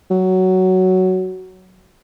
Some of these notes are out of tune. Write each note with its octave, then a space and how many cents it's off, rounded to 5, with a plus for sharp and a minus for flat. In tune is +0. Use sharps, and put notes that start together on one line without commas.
F#3 +10